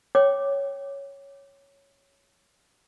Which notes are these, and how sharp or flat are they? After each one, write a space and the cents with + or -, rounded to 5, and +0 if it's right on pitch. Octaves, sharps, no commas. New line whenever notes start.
C#5 +0 G5 -10 D6 +0